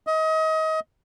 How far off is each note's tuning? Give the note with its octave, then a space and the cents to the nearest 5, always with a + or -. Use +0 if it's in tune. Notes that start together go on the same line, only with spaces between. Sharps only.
D#5 +30